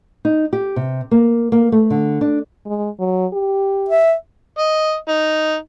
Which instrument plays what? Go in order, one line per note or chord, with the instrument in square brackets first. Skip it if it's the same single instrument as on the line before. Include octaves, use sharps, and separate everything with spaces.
[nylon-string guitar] D#4
G4
C3
A#3
A#3
A3
D3
D4
[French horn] G#3
F#3
G4
[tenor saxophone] E5
[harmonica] D#5
D#4